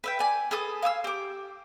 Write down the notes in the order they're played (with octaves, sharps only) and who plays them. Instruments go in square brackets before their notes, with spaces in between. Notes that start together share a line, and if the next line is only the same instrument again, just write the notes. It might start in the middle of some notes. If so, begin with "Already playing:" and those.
[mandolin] B4 E5 G5
D5 G#5
G#4 A4 B4 D#6
F5 G#5 D#6 E6
G4 D6